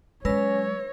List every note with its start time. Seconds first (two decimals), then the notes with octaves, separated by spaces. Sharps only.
0.25 F#3 G#3 C#4 B4 C#5 E6 A#6